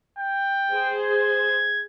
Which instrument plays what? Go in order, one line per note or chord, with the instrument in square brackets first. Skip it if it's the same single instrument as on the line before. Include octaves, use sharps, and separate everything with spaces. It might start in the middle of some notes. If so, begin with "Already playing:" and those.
[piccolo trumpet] G5
[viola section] G#4 C5
[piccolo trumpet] G#6